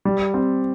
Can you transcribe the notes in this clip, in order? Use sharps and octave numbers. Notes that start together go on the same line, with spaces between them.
G3
C4